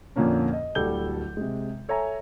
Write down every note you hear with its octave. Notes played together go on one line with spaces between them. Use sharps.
F2 A#2 D3 A#3 C#4 D4
D#5
D1 D2 G3 A4 G6 G7
C3 G#3
A4 C#5 E5 G#5 A#5